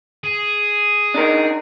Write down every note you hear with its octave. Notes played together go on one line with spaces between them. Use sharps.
G#4
D4 D#4 A#4